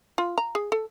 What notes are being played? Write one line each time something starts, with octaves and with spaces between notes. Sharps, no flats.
F4
A#5
G#4
A4